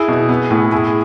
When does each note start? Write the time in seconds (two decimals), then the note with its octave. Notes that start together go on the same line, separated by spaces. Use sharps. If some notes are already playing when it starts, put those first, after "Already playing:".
Already playing: E4 G#4
0.08 B2
0.29 B3
0.51 A2
0.72 E4 G#4